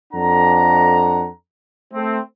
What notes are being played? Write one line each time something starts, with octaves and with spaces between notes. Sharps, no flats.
F2 D4 A4 F#5 A#5
A3 C4